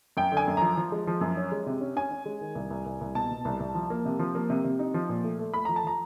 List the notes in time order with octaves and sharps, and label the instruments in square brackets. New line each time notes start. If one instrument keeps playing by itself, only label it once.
[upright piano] F#2 G5
D3 G#5
F#2
F3 A#5
F3
G#3
F3
F#2
C#4
G#3
C3
C#4
C#4 G#5
C#4
G#3
D#3
C2
C2
C2
C2
B2 A5
B2
C2
C2
F3
A#3
C3
F3
A#3
C3
C3
D#4
F3
A#2
A3
A3
A3 B5
F3 A#5
A5
F3 A#5